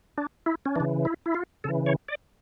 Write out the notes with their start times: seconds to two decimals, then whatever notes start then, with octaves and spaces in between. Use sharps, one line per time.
0.18 D4
0.46 E4
0.66 C#4
0.76 E3 D4
0.80 C#3
1.05 E4
1.26 E4
1.34 F4
1.64 C#3 E3 A4
1.86 C#5
2.08 D5